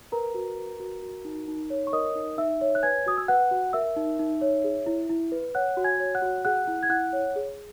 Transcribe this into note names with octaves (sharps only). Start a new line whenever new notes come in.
A#4 B4 A#5
F#4
B4
F#4
F#4
D#4
D#4
C#5
C#6
A#4 D#5 D#6
D#4
D#4 E5 E6
C#5
F#6
B4 G#5 G#6
F#4 D#6
E6
B4 F#5 F#6
F#4
A#4 E5 E6
D#4
D#4
C#5
G#4
E4
E4
B4
C#5 F#5 F#6
F#4
G#5 G#6
C#5
F#5 F#6
F#4
G#4 F#5 F#6
E4
G#6
E4 F#5 F#6
C#5
G#4